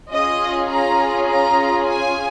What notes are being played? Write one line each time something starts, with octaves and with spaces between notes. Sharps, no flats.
C#4 F4 G#4 D#5
A#5
A#5
G#5